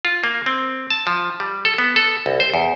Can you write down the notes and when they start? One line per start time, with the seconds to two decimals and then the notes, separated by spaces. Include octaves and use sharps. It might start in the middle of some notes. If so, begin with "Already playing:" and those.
0.05 F4
0.24 A#3
0.46 C4
0.90 A5
1.07 F3
1.40 G3
1.65 A4
1.78 B3
1.96 A4
2.26 C2
2.40 C5
2.54 E2